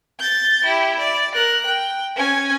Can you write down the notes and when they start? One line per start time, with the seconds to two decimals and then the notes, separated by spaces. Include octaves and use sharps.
0.19 G6 A6
0.65 E4 G4
0.99 D5
1.34 A#4 F#6
1.66 G5
2.16 C#4 G#5